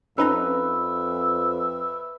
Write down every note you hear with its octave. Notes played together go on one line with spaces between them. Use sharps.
F2 C#4 D#4 B4 E5 A#5